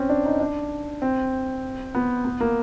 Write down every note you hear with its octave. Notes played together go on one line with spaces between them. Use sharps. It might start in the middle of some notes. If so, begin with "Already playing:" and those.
Already playing: C4 C#4
D4
D#4
D4
C4
B3
B3
A#3